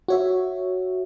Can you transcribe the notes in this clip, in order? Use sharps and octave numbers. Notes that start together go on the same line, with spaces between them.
F#4 C#5 E5